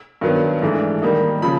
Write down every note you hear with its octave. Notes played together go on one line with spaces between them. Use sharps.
G2 D#3 F#3 B3
G#2 E3 A3 D4
D#3 G3 A#3 D#4
C#3 F3 B5